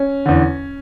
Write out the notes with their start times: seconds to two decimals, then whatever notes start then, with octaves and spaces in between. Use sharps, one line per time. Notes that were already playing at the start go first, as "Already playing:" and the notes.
Already playing: C#4
0.26 E2 D3